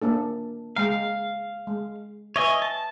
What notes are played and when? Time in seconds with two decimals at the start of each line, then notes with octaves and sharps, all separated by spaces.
0.02 A#3 D4 A4
0.76 G#3 F5 G5 A#5
1.67 G#3
2.36 B4 C#5 D#5 E5 G#5
2.62 A5